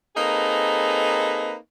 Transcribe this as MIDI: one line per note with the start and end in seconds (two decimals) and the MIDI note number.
0.16 1.56 58
0.16 1.56 60
0.16 1.56 63
0.16 1.56 68
0.16 1.56 69
0.16 1.56 71